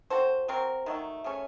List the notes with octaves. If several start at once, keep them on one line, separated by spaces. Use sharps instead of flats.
C4 F#4 A4 C5
F#3 C4 F#4 A#4
D#3 F#3 A3
C#3 A3 C#4